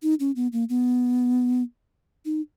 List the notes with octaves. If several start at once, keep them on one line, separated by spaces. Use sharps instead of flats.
D#4
C#4
B3
A#3
B3
D#4